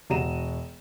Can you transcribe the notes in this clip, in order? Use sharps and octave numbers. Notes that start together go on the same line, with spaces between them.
E1 F#4 A#5 D#7 E7